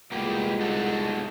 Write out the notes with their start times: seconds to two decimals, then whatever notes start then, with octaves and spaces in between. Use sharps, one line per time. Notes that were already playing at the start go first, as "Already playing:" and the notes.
0.12 C2 G#3 A#3 B3 F4 G4
0.61 D#4 F#4 A4